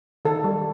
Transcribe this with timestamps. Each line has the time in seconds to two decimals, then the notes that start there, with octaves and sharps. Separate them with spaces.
0.25 D#3 A4
0.44 G3